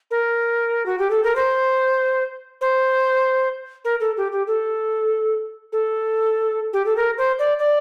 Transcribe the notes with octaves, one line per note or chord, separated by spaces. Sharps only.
A#4
F#4
G4
A4
A#4
C5
C5
A#4
A4
G4
G4
A4
A4
G4
A4
A#4
C5
D5
D5